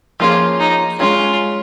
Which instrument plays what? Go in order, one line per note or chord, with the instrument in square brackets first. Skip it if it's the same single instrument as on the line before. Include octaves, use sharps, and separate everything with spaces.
[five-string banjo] F3 A#3 C#4 G#4 [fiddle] F4
[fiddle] D#4
[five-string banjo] G#3 C#4 G#4 [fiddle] F4